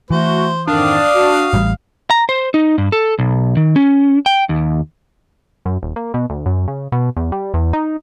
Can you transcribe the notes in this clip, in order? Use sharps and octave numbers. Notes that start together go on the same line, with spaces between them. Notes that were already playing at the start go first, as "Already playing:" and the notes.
E3 A3 F#4 C5
F2 G#2 D#3 D4 F5 D#6
F#4
A1 G3
A#5
C5
D#4
G2
A4
B1
D#3
C#4
G5
D#2
F#2
D#1
A#3
B2
D2
F#2
C#3
B2
E2
G3
E2
D#4